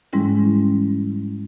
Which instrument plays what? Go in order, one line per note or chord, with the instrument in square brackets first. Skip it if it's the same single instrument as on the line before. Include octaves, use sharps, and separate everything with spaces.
[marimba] G#2 E3 G3 G#3 C#4 E4